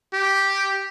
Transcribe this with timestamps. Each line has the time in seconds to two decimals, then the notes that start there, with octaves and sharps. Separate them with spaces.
0.13 G4